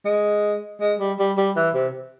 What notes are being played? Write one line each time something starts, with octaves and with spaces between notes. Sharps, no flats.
G#3
G#3
G3
G3
G3
E3
C3